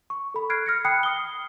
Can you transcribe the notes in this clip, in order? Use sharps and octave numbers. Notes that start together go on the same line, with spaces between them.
C#6
A4 B5
F6 F#6 G#6 C7 D7
F6 A#6 C#7
G5 B5 D#6 F#6 C7 C#7
D#6 G7